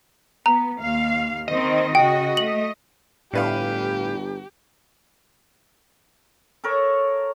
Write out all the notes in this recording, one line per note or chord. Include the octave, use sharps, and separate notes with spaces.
B3 A#5
D#2 F5
D#3 C4 D#5
C#3 F#4 G5
A3 F#7
G1 A2 D4 G4 B4 F5
A4 A#4 C#5